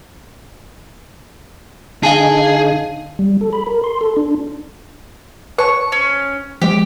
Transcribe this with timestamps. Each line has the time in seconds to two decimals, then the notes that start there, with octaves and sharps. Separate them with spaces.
2.03 D3 D#4 G#4 F5 G#5 A5
3.19 G3
3.41 A4
3.53 B5
3.67 A#4
3.84 C6
4.01 A4
4.17 D4
5.58 B4 C#5 A5 C#6
5.92 C#4
6.62 F3 G#3 G4